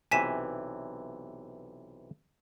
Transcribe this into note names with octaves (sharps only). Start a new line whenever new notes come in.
B1 C3 E3 G#5 B6 E7